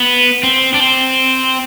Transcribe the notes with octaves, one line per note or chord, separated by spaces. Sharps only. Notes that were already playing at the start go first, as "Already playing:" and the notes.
Already playing: B3
C4
D4
C4